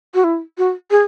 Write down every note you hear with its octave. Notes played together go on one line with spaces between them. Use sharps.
F#4
E4
F#4
G#4